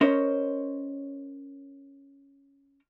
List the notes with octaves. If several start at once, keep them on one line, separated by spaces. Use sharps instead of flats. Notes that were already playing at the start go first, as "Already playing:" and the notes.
C#4 A#4 C5 C#5 D#5